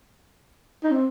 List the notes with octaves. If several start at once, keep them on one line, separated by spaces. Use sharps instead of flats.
D#4
C4